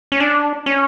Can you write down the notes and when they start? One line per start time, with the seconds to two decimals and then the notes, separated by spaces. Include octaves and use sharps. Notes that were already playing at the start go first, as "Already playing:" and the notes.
0.12 C#4
0.20 D4
0.66 C#4